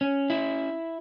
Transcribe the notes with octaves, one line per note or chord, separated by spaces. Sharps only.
C#4
E4